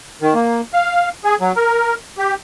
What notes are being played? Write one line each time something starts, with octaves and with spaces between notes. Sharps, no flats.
D#3
A#3
F5
G#4
F#3
A#4
G4